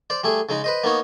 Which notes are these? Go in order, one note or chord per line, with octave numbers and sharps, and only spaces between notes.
C5 D5
G3 A3 G#4
C#3 G#3 D#4
B4 C5 D#5
A#3 B3 D#4 C#5